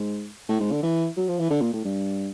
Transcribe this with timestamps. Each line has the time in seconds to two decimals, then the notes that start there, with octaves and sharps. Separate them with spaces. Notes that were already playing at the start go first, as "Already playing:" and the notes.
Already playing: G#2
0.48 A2
0.60 G#2
0.71 D3
0.83 E3
1.17 F#3
1.28 F3
1.39 E3
1.50 D3
1.61 A#2
1.73 A2
1.84 G2